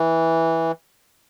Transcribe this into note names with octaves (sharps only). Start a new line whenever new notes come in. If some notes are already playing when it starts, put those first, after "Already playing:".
Already playing: E3